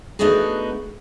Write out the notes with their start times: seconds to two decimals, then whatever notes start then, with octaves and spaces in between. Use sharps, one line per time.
0.19 A3 B3 D4 D#4 F#4 G#4